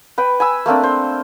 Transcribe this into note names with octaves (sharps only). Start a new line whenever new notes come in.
B4 G5
G#5 B5 E6
A3 A#3 C4 D4
C5